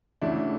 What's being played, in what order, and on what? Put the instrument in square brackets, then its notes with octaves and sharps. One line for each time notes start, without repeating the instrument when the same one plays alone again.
[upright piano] D2 C#3 E3 A3 D4 E4